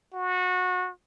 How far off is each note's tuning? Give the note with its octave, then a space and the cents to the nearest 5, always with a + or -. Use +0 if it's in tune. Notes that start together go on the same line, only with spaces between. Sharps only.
F#4 -25